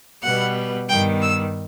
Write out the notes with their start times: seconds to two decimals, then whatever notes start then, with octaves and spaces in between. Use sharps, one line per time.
0.22 B2 G3 B3 F#5
0.88 G2 D#3 G3 B3 G5
1.22 E6